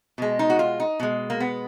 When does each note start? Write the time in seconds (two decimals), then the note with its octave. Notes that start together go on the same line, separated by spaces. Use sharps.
0.18 B2 G#3
0.39 D#4
0.50 F#4
0.59 F4
0.80 D#4
1.00 B2 G#3
1.30 A#3
1.40 B3